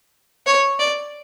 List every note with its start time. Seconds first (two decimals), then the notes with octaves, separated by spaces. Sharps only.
0.46 C#5
0.79 D5